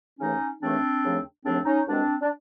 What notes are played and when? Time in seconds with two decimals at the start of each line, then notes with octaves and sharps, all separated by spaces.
0.20 D#2 C#3 E3 A3 C#4 D#4
0.61 D#2 C#3 E3 A3 C4 D4
1.03 D#2 C#3 F3 A3
1.45 D#2 C#3 F3 A3 C4 D4
1.65 C#4 D#4
1.86 C2 B2 G#3 C4 D4
2.21 D4